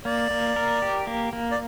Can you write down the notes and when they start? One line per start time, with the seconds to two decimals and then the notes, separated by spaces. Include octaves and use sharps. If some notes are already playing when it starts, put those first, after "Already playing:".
0.05 A#3 D5
0.31 A#3
0.56 A#4
0.82 G4
1.07 A#3
1.33 A#3
1.52 D5